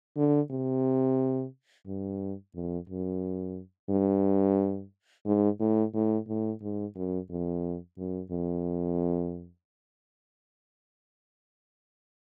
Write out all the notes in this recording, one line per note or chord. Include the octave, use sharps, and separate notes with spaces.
D3
C3
G2
F2
F#2
G2
G#2
A2
A2
A2
G#2
F#2
F2
F#2
F2